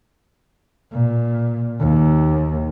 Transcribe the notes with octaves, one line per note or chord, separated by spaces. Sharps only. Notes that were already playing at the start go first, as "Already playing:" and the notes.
A#2
D#2